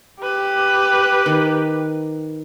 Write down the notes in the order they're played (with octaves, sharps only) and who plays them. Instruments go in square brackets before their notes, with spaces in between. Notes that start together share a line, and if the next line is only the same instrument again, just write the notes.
[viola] G4 [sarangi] B4
[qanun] D#3